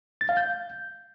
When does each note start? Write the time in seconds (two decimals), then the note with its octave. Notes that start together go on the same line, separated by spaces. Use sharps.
0.21 A6
0.29 F5
0.37 G6